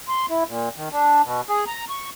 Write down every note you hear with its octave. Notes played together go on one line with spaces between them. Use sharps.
C6
E4
A#2
D#3
D4
B2
G#4
A#5
C#6